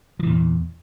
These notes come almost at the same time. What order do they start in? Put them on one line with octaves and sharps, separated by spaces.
F3 E3 A#2 E2